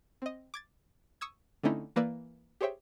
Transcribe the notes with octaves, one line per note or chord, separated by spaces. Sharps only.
C4 D#5
D6 G#6 A6
C#6 D#6 E6 G#6
D3 A3 C4 C#4 D#4 E4
E3 A#3 B4 D5 E6
G4 G#4 C5 C#5 E5 G5